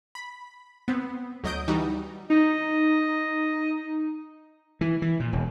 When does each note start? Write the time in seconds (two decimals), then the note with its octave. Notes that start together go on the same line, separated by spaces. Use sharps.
0.15 B5
0.88 B3 C4
1.44 D2 F#3 D#5 D#6 G6 D7
1.68 E3 G3 D#4 F#4
2.30 D#4 D#5
4.81 E3
5.02 E3
5.20 A#2
5.33 E1